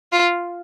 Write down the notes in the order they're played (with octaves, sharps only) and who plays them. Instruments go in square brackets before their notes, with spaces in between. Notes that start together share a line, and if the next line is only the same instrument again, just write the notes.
[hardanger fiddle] F4